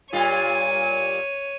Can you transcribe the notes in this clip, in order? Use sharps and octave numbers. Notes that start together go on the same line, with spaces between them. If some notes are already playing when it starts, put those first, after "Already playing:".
A#2 G3 F4 C#5 D#7